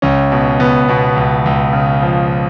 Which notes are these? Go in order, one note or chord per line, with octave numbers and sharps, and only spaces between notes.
C#2 C#4
B2
C#2 B3
B2
C#2
C#2
C#3
F3